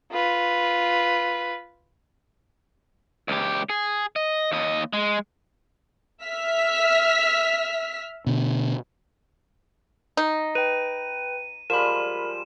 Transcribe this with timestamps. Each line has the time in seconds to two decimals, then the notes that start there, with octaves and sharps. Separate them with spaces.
0.12 F4 B4
3.28 C#2 G4
3.69 G#4
4.16 D#5
4.52 D#2 D#5
4.93 G#3
6.24 E5 F6 B6
8.27 B2 D3
10.17 D#4
10.55 B4 G5 D#7
11.70 F3 G3 G#3 A#4 B5 E7